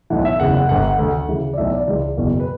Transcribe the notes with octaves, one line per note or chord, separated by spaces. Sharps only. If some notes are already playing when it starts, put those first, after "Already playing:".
B1 A2 E3 F#5
E5
F#1 E2 C#3 F#5
F#5
G1 G2 D3 F#5
F#5
D2 D3
D2 C#3 E3
D5
B1 A2 E3 E5
D5
C#2 C#3 E3
F#1 E2 B2
B4